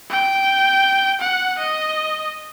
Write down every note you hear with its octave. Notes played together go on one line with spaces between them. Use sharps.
G5
F#5
D#5